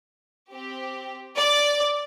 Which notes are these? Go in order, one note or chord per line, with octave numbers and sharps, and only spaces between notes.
C4 G4
D5